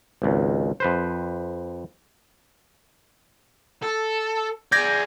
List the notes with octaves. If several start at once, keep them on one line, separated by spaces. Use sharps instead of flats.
G#1 C#2
F2 B4 C5
A4
G#4 D5 G6 G#6 A#6